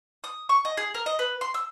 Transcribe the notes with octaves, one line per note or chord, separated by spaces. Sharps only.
D#6
C#6
D#5
G#4
A#4
D#5
B4
C6
E6